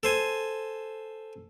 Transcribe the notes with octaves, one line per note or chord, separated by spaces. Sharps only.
A4 C5 G#5